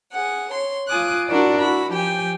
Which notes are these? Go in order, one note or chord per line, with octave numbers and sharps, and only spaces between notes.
G#4 F#5
C#5 C6
F4 G#5 D6 D#6 F#6
D4 E4 F#4 A#4 D5
E4 F#4 B5
F3 G4 G5 G#5